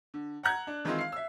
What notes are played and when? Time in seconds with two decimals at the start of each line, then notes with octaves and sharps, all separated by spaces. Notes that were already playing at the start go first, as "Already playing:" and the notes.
0.14 D3
0.43 F#5 A#5 F#6 G#6
0.67 D4
0.85 D#3 E3 G#3 C4 D#4 F4
0.99 F5 C7
1.12 E5 E6